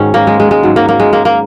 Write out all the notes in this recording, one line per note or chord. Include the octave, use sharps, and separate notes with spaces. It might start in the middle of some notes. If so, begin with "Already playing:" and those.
Already playing: G#2 D#3 F#3 C#4
A#3
G#3
G#3
G#3
G#2 F#3
A#3
A#3
G#3
A#3
A#3